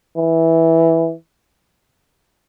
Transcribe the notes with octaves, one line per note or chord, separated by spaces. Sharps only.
E3